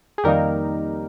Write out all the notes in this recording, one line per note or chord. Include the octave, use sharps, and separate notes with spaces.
G#4
F2 D#3 G3 A#3 D#4 G4 A#4